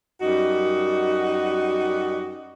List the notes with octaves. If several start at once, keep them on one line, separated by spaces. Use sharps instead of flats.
F#2 G3 D#4 F#4